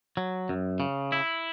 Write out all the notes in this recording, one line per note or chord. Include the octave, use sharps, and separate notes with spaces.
F#3
F#2
C#3
E4